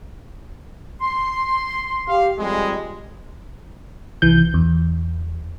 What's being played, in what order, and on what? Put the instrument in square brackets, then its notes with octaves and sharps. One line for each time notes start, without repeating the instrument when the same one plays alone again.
[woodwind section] C6
[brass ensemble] G4 F5
F2 G3 G#3
[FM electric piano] C2 E3 G6
E2